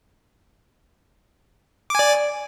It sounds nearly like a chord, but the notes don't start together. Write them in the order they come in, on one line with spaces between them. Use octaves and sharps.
D6 G#5 D5